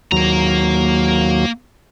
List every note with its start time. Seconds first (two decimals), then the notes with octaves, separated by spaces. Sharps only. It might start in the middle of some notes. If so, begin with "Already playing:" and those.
0.12 D#2 F#3 A#3 A#5